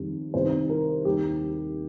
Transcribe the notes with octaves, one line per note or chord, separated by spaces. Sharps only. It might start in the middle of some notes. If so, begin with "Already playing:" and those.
Already playing: F2 D#3 G3
C2 C3 D#3 G3 C5
A#4
D#2 D#3 G3 G4